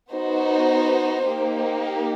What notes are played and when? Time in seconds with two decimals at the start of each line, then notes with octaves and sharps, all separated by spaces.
0.12 B3 D#4 F#4 C5
1.29 A#3 D#4 G4